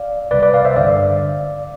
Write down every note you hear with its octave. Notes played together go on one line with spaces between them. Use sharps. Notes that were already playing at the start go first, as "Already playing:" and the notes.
Already playing: D5 F5
C2 C3 G3 B4 D5
B4 D5
D5 F5
C5 E5
G2 D3 G3 D5 F5